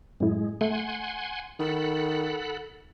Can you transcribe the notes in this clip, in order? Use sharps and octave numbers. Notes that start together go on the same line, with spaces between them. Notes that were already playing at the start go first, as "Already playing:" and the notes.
F#2 A2 G#3
A3 F#5 G#5 C6
D#3 A4 F#5 B5